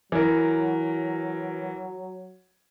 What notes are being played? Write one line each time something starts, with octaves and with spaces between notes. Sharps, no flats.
E3 F#3 A#4